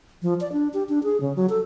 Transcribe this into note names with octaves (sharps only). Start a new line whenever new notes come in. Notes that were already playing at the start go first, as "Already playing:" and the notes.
F3
D5
D4
G4
D4
G#4
C#3
F#3
A4